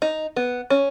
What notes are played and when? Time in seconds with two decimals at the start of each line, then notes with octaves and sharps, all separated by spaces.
0.02 D#4
0.36 B3
0.70 C#4